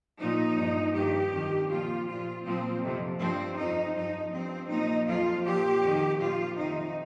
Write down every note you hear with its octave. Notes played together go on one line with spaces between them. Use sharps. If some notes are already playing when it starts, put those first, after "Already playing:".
A#2 F3 D#4
G2 F3
G2 D#3 G4
F2 D#3
A#2 F3 F4
A#2 F3 F4
A#2 F3 C4
F2 C3 F3
G2 F3 C4
F2 F3 D#4
G2 F3 D#4
G2 F3 C4
A#2 F3 D#4
F2 F3 F4
A#2 F3 G4
F2 D#3
A#2 F3 F4
F2 C3 D#3 D#4